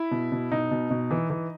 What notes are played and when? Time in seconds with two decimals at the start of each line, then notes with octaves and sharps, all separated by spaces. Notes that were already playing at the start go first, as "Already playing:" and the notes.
Already playing: E4
0.11 B2
0.32 B2
0.51 B2 D#4
0.71 B2
0.91 B2
1.11 E3
1.30 E3